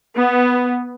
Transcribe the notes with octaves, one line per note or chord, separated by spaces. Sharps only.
B3